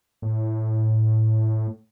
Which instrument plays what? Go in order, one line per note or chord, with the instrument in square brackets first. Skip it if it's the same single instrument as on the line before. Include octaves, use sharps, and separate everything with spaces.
[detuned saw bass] A2